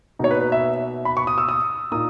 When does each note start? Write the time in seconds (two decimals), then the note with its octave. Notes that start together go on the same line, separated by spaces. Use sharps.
0.19 B2 A#3 D#4 C#5
0.31 B4
0.41 B4
0.52 E5
1.05 B5
1.17 C#6
1.27 D#6
1.38 E6
1.48 D#6
1.91 A#2 A#3 D#4 D#6